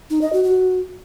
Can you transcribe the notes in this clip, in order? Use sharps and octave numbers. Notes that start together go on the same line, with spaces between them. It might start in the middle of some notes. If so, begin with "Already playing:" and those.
D#4
D#5
F#4
F#4